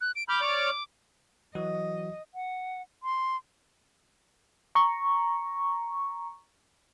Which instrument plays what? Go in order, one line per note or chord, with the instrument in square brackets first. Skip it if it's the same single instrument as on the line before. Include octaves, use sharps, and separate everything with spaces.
[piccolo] F#6
D7
[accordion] B5 F6 G6 [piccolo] D6
[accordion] C#5 D5 F6
[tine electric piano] E3 F#3 F#4 [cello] D#5
[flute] F#5
C6
[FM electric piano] A#5 C#6